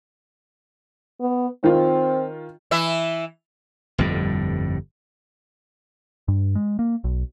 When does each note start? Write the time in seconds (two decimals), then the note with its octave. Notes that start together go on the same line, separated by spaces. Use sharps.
1.21 B3
1.64 D#3 C4 F4
2.71 E3 E4 E5
3.98 G1 F2 A2 G3
6.28 G2
6.55 G#3
6.79 A#3
7.04 B1